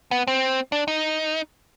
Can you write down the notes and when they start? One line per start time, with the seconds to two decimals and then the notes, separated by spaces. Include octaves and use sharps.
0.11 B3
0.27 C4
0.72 D4
0.88 D#4